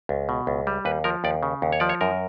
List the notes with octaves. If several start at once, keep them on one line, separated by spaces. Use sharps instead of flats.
C#2
B2
C#2
G3
D#2 B4
F3 A#4
D#2 D5
C#3
D#2
C#5
F3 D5
C#5
F#2 A#4